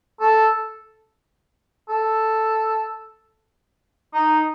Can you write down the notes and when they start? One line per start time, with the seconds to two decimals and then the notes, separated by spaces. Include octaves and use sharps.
0.20 A4
1.89 A4
4.14 D#4